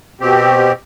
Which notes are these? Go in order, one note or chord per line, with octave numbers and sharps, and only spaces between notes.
B2 C4 G4